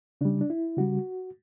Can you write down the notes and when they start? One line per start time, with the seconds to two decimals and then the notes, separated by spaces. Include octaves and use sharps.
0.21 C#3 G3 D4
0.41 D4
0.50 E4
0.77 C#3 G3 F#4